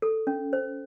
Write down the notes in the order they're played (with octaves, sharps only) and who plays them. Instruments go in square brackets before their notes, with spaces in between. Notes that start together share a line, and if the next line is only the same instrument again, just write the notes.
[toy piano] A4
C#4
C5